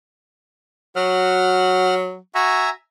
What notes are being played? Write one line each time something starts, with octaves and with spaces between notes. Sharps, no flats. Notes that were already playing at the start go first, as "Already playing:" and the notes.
F#3 F#4 F#5 F6
F#4 E5 G#5 A#5